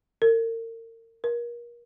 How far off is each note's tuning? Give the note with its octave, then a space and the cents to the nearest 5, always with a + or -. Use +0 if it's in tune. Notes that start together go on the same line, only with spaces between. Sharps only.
A#4 -35
A#4 +30